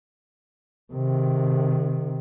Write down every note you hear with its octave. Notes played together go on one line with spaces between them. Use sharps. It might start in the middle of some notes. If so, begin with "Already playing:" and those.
C3 D#3